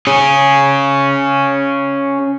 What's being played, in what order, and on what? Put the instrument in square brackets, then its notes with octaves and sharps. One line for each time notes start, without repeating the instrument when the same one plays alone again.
[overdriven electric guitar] C#4 G#4